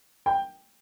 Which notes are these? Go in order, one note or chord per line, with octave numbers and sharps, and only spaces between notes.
G5